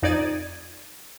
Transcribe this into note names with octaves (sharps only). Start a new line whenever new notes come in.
F2 D#4 D5 G#6 A6 D#7